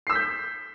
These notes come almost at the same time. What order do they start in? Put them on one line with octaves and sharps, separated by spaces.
C7 E6 B6 G6